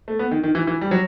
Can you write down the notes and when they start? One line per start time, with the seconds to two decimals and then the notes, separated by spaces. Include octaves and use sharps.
0.08 A3
0.19 B3
0.31 D#3
0.43 D#3
0.55 E3
0.67 E3
0.81 G3
0.91 F#3